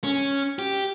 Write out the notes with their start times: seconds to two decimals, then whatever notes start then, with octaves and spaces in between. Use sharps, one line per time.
0.04 C#4
0.59 G4